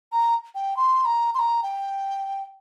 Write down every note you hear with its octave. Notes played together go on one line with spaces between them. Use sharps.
A#5
G5
C6
A#5
C6
A#5
G5